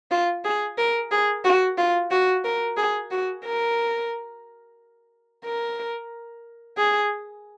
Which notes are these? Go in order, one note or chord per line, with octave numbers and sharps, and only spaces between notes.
F4
G#4
A#4
G#4
F#4
F4
F#4
A#4
G#4
F#4
A#4
A#4
G#4